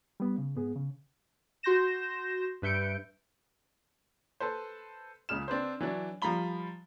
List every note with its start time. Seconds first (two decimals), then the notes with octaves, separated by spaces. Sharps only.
0.20 G3 B3
0.38 C#3
0.56 G#2 B3 G#4
0.75 C#3
1.63 F#4 C6 G6 A#6 E7
2.62 G2 B4 E5 G6 C#7 D7
4.40 A4 B4 C5
5.29 C#2 C#3 F6 E7
5.48 C4 D4 B4 C5
5.80 E3 F#3 D4
6.22 F3 G3 F5 A#5 B5 G7